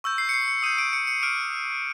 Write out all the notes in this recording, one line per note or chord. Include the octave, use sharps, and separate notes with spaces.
C#6 E6 G6
C7
C#7
C7
C#7
D#6 G6 D#7
D7
C#7
C#7
D6 F6 D7